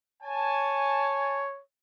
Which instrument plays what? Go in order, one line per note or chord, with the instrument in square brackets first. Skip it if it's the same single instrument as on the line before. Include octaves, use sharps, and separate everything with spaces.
[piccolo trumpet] C#5 [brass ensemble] G#5 A5